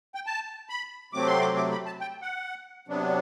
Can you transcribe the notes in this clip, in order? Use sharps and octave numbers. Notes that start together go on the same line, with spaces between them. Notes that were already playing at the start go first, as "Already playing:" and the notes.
G5
A5
B5
C3 F#3 A3 C4 D6
C6
D6
D6
B5
A5
G5
F#5
C3 F#3 B3 D4